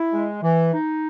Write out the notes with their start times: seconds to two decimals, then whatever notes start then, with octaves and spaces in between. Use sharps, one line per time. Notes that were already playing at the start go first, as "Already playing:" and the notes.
Already playing: E4
0.12 G#3
0.42 E3
0.73 D#4